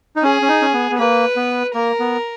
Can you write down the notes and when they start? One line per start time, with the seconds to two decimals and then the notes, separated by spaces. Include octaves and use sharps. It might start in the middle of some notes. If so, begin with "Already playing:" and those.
0.16 D#4
0.23 C#4 G#4
0.42 C#4
0.48 D#4
0.62 C#4
0.73 B3
0.91 B3
0.98 A#3 B4
1.36 B3
1.74 A#3 A#4
2.00 B3